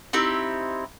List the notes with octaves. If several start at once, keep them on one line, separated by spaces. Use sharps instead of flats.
C4 D#4 E4 G4